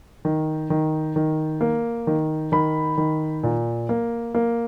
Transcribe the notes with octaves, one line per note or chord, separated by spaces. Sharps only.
D#3
D#3
D#3
A#3
D#3
D#3 B5
D#3
A#2
A#3
A#3